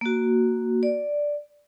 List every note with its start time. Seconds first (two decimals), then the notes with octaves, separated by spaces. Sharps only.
0.01 A#3 F#4
0.83 D5